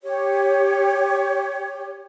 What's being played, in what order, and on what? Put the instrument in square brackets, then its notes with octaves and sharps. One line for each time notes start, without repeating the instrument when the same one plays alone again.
[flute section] G4 C#5